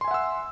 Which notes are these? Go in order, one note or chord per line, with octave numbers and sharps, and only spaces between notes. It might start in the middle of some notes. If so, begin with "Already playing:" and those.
E5 F#5 G#5 C6 E6